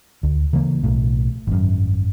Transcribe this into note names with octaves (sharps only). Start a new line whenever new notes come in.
D2
C#3 E3 A#3
B1 A2
G#1 F#2